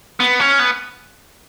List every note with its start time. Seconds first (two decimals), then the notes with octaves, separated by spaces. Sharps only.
0.20 B3
0.40 C#4
0.59 B3